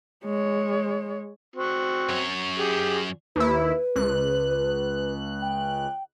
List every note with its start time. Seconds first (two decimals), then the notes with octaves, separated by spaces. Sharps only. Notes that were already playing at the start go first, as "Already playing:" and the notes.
0.25 G#3 C#5
1.56 C4 F#4
2.09 F#2 C#5
2.58 G4 G#4
3.36 D#2 E4 B4
3.96 C#2 F#6
5.42 G5